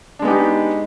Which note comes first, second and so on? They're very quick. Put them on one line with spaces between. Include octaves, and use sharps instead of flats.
D4 G#3 B3 G4 D#4